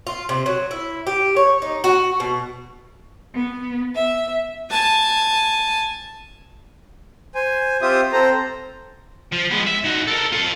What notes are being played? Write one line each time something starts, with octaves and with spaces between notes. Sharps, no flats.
F4
C3
F#3
E4
G4
C#5
D#4
F#4
B2
B3
E5
G#5 A5
C5 G#5
C4 F4 G4 C5 E5 D#6
C4 A4 C5 A#5
F3
G#3 B3
E5
D#3 F#4
A4 A#4
F4 A4